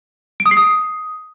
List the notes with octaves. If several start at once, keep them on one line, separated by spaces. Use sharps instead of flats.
D7
D#6
C7
D#6